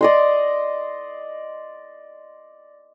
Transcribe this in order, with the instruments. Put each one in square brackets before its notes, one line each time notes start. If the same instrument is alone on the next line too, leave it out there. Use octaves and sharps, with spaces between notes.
[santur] D5 D#5 C6